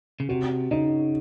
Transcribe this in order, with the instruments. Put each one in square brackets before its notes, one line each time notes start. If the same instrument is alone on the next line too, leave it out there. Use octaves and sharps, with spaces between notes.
[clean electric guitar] C#3
[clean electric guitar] C3 [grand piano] F#4
[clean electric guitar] C#3 [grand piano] D#4